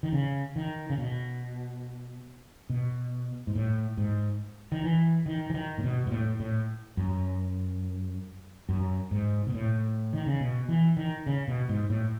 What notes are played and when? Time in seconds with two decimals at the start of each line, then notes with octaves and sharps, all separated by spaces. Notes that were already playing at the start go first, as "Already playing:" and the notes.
0.03 D#3
0.12 C#3
0.56 D#3
0.90 C#3
0.98 B2
2.70 B2
3.47 G#2
3.55 A2
3.97 G#2
4.72 D#3
4.84 E3
5.26 D#3
5.50 E3
5.54 D#3
5.78 A2
5.84 B2
6.07 G#2
6.11 A2
6.40 A2
6.97 F#2
8.69 F#2
9.11 G#2
9.47 B2
9.54 A2
10.13 D#3
10.26 C#3
10.40 B2
10.69 E3
10.97 D#3
11.26 C#3
11.48 B2
11.69 G#2
11.90 A2